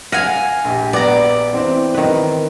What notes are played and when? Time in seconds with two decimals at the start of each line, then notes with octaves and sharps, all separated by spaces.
0.12 F5 F#5 G#5 A#6 D#7 F7
0.64 A#1 G4
0.93 B3 D5 A#5
1.53 E3 C4
1.94 D#3 B4